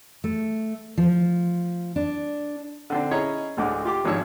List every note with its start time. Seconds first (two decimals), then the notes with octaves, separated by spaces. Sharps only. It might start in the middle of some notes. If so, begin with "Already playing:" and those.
0.24 A3
0.98 F3
1.96 D4
2.90 D3 C4 D4
3.11 C#4 E4 G#4 C#5 D#5 A#5
3.57 A1 D2 D3 G#3 D6
3.85 F4 G4 D6
4.05 G#1 G#2 F3 D4 C#5 E6